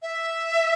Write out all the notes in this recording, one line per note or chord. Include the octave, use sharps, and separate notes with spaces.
E5